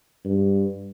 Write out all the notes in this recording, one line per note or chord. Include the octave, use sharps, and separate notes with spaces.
G2